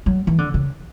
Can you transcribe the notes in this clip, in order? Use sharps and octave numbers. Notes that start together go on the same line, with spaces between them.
F#3
E3
D3
C#3